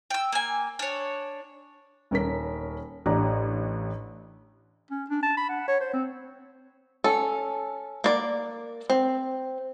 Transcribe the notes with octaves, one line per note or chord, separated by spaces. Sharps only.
G5 E6
A#3 G#5
D4 C#5
D#1 C#4 A#4 B6
A1 D4 G4 D5 A#5
C#4
D4
A5
B5
F#5
C#5
C5
C4
C#4 A4
A#3 D5
C4